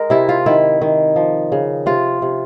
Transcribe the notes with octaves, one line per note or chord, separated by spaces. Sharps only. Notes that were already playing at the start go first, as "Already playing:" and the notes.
Already playing: G#3 A#4
C3 E4
F4
D#3 E4
D#3
F3
C#3
C3 F4
C3